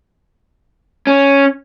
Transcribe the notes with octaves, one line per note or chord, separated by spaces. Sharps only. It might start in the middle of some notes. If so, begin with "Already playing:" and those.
C#4